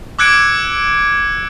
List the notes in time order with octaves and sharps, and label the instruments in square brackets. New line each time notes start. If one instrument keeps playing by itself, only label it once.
[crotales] D6 E6 F#6 G#6 C#7 D7